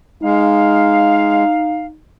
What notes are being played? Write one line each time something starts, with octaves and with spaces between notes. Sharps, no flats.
G#3 D#4 F5